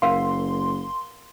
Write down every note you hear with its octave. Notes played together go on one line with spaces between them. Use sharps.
F#1 A#4 F5 F#5 C6